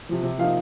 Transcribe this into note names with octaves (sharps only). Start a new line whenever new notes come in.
C3 F3
C3
F3 A#3 D#4 F5